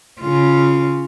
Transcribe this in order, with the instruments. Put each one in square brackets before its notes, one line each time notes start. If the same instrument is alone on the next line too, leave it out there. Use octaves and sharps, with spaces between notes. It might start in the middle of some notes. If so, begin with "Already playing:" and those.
[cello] C#3 F4